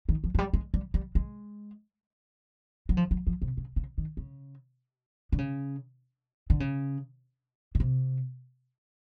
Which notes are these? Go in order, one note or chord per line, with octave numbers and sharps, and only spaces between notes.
D#3
F3
F#3
G3
G#3
G3
G3
G#3
F#3
F3
F#3
F3
C3
C#3
C#3
D#3
C#3
D3
C#3
D3
C#3
B2
C3